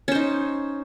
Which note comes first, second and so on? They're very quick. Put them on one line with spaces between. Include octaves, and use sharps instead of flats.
C#4 C5 D#4